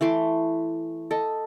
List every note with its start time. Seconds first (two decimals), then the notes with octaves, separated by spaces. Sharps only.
0.01 E3 A3 C6 D6
1.11 A4 D#5